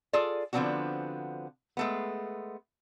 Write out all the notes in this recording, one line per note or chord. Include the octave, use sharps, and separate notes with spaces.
F4 G#4 A4 D5
D3 F3 B3 C4 D4 F#4
G#3 A3 B3